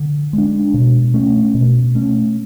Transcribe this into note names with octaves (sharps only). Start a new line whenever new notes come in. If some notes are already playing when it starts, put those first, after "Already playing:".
Already playing: D3
G#3 D4
B2
A3 C#4
B2
A3 C#4